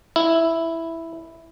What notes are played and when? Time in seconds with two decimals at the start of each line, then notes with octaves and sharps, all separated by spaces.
0.16 E4